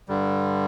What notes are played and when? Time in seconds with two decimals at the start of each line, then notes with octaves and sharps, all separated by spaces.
0.09 G2 D3 G3